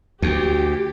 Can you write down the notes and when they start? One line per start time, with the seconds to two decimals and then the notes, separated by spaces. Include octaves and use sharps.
0.22 D2 G4